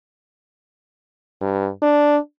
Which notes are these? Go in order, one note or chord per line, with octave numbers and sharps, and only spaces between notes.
G2
D4